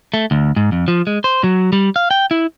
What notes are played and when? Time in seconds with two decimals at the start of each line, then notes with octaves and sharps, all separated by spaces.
0.14 A3
0.31 D2
0.56 G#2
0.72 F2
0.88 F3
1.07 G#3
1.24 C5
1.44 F#3
1.73 G3
1.96 F5
2.11 G5
2.31 E4